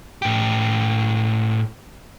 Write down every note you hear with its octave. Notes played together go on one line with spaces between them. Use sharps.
A2 G4